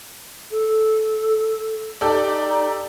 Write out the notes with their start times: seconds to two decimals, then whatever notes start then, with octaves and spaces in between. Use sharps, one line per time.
0.50 A4
2.01 D#4 G4 A4 D5